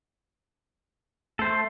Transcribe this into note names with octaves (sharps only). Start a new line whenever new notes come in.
A3 A4 C5